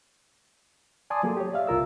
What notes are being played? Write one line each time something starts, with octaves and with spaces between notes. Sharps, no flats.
D5 G#5 A5 C6 D6 D#6
F#3 A#3 G#4 A4
G4 C#5
D5 E5 F5
C2 F4 A#4 E6